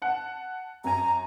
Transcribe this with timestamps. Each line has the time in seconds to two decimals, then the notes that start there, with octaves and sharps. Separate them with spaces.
0.02 F#5 A5
0.84 F#2 G#5 A#5